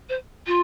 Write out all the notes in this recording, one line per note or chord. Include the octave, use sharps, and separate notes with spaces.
C5
F4